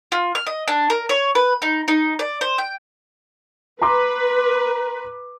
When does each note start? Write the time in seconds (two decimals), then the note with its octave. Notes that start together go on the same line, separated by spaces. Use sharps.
0.12 F4
0.35 F6
0.47 D#5
0.68 D4
0.90 A#4
1.09 C#5
1.35 B4
1.62 D#4
1.88 D#4
2.19 D5
2.41 C5
2.58 G5
3.81 B4 A#5 C6 D6